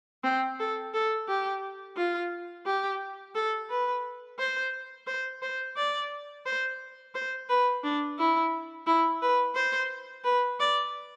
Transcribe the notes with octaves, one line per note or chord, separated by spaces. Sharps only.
C4
A4
A4
G4
F4
G4
A4
B4
C5
C5
C5
D5
C5
C5
B4
D4
E4
E4
B4
C5
B4
D5